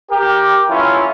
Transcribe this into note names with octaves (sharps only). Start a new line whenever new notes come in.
G4 A#4
E3 F#3 A3 C#4 E4 F4